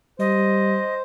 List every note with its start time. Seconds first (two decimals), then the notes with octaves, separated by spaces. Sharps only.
0.20 G3 C5 D#5